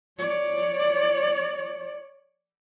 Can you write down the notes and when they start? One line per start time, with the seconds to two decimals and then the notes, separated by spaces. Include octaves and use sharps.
0.19 C#5 D5